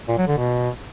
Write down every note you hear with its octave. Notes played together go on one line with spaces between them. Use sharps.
A#2
F#3
D3
B2